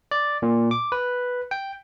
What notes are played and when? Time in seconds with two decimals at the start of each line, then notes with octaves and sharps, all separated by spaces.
0.11 D5
0.42 A#2
0.71 D6
0.92 B4
1.51 G5